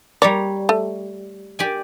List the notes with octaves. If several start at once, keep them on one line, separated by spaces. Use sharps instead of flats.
G3 C#5 D5 A#5
A3
G4 D5 G#5